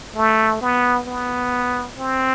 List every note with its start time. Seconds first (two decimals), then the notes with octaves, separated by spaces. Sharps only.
0.16 A3
0.61 B3
1.07 B3
1.97 C4